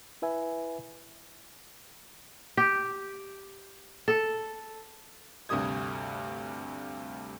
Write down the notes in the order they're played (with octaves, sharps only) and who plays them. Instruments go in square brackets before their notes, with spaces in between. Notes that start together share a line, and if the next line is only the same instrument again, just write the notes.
[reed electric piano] E4 B4 E5 G#5
[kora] G4
A4
[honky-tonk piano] D2 G2 C3 G3 D#6 G#6